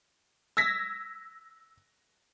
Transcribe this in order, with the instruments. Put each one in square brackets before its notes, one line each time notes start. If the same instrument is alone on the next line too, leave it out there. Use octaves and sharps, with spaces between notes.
[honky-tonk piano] E6 G#6 A#6 B6